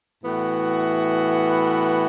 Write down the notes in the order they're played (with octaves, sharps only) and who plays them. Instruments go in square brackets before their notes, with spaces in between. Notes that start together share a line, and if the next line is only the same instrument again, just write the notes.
[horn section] A2 E3 B3 F#4